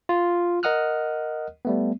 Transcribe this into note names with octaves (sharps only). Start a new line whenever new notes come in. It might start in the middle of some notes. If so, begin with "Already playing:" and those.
F4
A#4 D#5 F#5 D#6 F6 F#6
G3 A3 B3